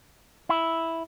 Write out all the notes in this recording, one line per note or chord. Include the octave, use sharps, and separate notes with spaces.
E4